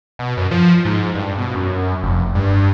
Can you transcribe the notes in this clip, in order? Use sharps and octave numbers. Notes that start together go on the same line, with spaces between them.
B2
F#2
F3
G#2
G2
B2
F#2
F1
G2